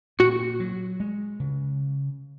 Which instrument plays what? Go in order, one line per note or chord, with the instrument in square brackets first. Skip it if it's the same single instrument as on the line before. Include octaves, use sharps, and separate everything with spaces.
[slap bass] A#2 [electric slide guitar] F#4
[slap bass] F#3
G#3
C#3